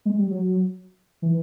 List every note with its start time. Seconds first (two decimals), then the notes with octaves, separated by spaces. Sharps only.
0.05 G#3
0.19 G3
0.31 F#3
1.22 E3